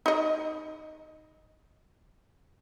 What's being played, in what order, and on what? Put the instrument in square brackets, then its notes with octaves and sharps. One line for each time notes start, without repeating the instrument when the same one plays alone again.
[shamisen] D#4 D#5